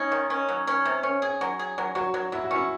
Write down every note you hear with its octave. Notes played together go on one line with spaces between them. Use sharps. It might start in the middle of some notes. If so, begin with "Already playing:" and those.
Already playing: C#4 D#4
D#3
C#4
F#3
C#4
C3
C#4
G#4
F#3
G#4
F#3
F#3 F#4
F#3
F#3 E4
F#4
C#4 E4